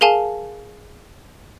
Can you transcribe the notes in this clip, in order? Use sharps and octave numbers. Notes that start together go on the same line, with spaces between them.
G#4 A#4 F5 G#5 A5